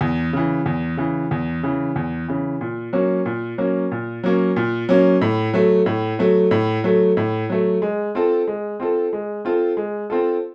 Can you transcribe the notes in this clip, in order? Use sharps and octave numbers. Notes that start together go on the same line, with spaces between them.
E2
C#3 E3
E2
C#3 E3
E2
C#3 E3
E2
C#3 E3
A#2
F#3 A#3 C#4
A#2
F#3 A#3 C#4
A#2
F#3 A#3 C#4
A#2
F#3 A#3 C#4
A2
F#3 A3
A2
F#3 A3
A2
F#3 A3
A2
F#3 A3
G#3
C4 F4 A4
G#3
C4 F4 A4
G#3
C4 F4 A4
G#3
C4 F4 A4